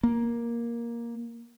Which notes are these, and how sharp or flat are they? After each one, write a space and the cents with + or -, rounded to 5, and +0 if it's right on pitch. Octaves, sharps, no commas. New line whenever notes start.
A#3 +10